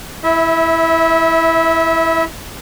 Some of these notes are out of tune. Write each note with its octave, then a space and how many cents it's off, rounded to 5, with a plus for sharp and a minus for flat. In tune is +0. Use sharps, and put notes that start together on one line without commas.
E4 +0 E5 -25